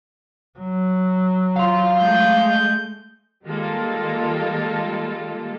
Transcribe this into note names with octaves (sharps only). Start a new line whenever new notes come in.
F#3
F5 C6
G#3 A3 G6
D#3 G3 G#3 A#3 F4 A4